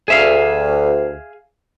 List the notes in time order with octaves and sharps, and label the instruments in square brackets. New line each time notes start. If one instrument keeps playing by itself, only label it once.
[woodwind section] D2 [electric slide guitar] G#4 E5 F5